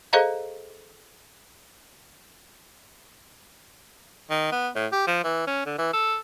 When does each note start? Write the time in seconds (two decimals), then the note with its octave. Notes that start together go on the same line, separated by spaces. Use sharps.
0.13 G#4 A4 C5 D#5 F5 A#5
4.30 D#3
4.52 B3
4.75 A2
4.92 G4
5.07 F3
5.24 E3
5.47 C#4
5.66 D3
5.78 E3
5.93 A4